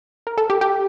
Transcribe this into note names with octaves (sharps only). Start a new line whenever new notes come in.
A#4
A4
G4
G4